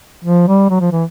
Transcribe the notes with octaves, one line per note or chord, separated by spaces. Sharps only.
F3
G3
F#3
F3
E3